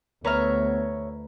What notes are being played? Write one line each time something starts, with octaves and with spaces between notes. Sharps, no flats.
D2 B3 B4 C#5 E5 A#5 F6